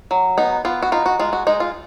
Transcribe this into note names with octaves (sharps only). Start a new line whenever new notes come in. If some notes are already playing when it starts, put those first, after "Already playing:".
F#3
B3 D#4
B3 F4
F#4
D#4 F4
F#4
G#3 F4
F#4
G#3 D#4
F4